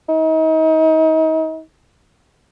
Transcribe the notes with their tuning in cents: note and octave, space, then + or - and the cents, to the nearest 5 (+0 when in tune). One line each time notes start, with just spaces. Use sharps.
D#4 +35